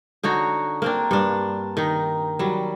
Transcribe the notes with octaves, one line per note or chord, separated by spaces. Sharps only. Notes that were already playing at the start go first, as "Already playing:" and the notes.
D3 D#4 F#4 C#5
A#3 C4 D4
G2 D4
D#3 D#4
F#3 G3